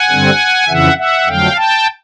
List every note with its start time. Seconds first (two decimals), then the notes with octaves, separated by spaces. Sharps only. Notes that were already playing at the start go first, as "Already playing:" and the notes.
Already playing: F#5 G#5
0.10 G2 D3 G3 C4
0.68 F2 C#3 E3 E5 F#5
0.97 E5 F#5
1.26 F2 D3 F#3 A3 F5 G5
1.56 G5 A5